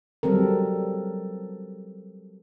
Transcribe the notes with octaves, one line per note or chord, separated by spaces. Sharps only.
F#3 G3 C4 A4 A#4